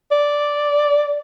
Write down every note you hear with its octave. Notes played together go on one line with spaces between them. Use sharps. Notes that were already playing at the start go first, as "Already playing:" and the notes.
D5